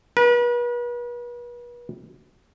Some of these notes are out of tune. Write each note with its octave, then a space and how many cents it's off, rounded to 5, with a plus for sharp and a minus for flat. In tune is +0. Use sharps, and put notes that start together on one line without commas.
B4 -40